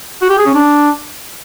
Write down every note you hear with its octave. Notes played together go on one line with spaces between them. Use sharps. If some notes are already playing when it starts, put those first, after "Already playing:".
F#4
G4
G#4
C#4
D4